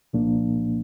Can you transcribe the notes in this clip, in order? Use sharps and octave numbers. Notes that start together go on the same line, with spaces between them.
C2 A#2 F3 A#3 D4